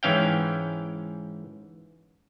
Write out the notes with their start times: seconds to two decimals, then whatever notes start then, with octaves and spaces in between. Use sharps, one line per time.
0.03 G#2 E3 C#4 F5 G5